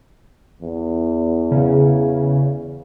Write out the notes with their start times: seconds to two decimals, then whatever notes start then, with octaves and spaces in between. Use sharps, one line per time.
0.62 E2
1.51 C#3